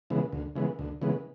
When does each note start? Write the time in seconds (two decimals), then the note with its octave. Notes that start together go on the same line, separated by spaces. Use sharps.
0.10 C#3 E3 G#3 B3
0.33 D2
0.55 C#3 E3 G#3 B3
0.79 D2
1.02 C#3 E3 G#3 B3